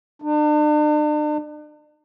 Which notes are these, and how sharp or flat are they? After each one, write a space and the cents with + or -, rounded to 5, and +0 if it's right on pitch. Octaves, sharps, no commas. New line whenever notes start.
D4 +40